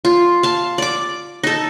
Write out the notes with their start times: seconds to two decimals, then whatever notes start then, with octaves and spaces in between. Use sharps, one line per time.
0.05 F4
0.43 F5 A5
0.78 D5 D6
1.43 D#4 A4